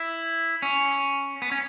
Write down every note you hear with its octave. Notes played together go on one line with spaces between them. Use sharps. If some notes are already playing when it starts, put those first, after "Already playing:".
Already playing: E4
C#4
B3
C#4